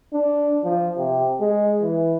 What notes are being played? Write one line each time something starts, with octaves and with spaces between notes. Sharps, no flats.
D4
F3
C3
G#3
E3